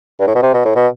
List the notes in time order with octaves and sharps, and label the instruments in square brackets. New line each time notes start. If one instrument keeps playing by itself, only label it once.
[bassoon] G2
A2
B2
C3
B2
A2
B2